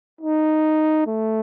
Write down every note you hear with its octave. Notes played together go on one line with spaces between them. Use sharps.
D#4
A3